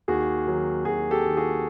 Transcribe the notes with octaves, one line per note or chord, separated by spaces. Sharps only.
D#2 F#4 G#4
D#3 F#3
D#2 F#4 G#4
G4 A4
D#3 F#3
F#4 G#4